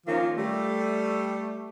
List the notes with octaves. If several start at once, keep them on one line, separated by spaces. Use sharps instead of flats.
D#3 F3 A#3 C#4 F4
G3 A3